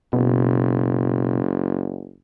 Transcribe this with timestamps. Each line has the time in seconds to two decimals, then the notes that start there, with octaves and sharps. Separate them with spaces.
0.13 F#1 B2